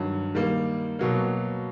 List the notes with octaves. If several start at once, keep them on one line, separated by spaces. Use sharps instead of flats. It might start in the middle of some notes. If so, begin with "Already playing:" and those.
Already playing: G2 D#3 F#3
D#3 G3 A#3
B2 F#3 A#3